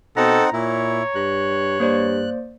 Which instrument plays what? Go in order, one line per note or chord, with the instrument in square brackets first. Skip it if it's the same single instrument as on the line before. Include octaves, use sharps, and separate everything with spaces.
[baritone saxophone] B2 [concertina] C4 D#4 F#5 [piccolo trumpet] A4 [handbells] A#5 A#6
[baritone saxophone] A#2 [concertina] E4 [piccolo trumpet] C#5
[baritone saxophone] G2 [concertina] F#6
[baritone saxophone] G2 [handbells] A#3 C5 D5